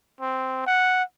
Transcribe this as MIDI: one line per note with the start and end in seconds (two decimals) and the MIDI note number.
0.21 0.66 60
0.67 1.03 78